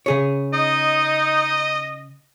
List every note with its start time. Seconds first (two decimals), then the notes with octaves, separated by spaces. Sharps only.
0.06 C#3 G#4 C#5
0.53 D#4 D#5